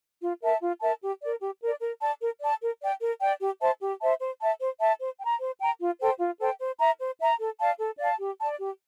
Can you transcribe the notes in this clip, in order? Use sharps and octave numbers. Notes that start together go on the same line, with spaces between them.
F4
A#4 E5 A5
F4
A#4 E5 A5
G4
A#4 D5
G4
A#4 D5
A#4
D5 A5
A#4
D5 A5
A#4
D5 G5
A#4
D5 G5
G4
C5 E5 A5
G4
C5 E5 A5
C5
E5 A5
C5
E5 A5
C5
G5
A#5
C5
G5 A#5
F4
A4 C5 G5
F4
A4 C5 G5
C5
E5 A#5
C5
E5 A#5
A4
D5 F5 A5
A4
D5 F5 A5
G4
D5 A5
G4